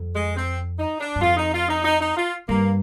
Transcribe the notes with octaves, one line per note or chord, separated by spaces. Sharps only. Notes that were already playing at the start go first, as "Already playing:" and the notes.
Already playing: F2
G#3
C4
D#4
D4
G2
F2 F4
D#4
F4
D#4
D#4
D#4
F4
G2 A#3